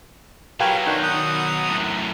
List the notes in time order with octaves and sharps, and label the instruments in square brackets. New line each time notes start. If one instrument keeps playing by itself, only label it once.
[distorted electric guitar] B2 F#3 [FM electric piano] F4 G4 B4 [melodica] A#4 C#5 G#5
[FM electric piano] D#3 F#6 G6 [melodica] D4 C#5
[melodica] F#5 A#5 D#6
[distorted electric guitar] F#2 A2